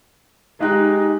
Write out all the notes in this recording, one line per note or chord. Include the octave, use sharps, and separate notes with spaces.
G#3 D#4 G4 F#6